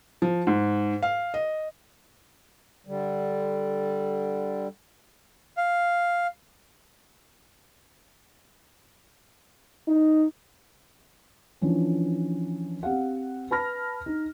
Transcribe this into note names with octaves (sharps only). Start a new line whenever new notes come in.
F3
G#2
F5
D#5
D3 G3
F5
D#4
E3 F3 C#4 D4
C4 G4 F5 F#5
B4 A5 B5 F6 A#6
D#4